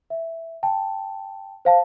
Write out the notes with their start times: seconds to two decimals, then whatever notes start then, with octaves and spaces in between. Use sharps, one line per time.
0.10 E5
0.63 G5 A5
1.65 C5 F5 A5